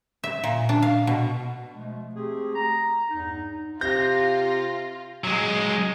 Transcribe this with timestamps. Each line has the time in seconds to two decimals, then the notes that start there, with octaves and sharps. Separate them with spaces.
0.24 E5
0.44 A#2
0.69 D4
0.82 F5
1.07 B2
1.73 B2 F3 G#3 A3
2.15 A3 C4 G4 G#4
2.55 A#5
3.11 E2 G2 D#4
3.81 C3 F4 G6 A#6
5.24 F#3 G#3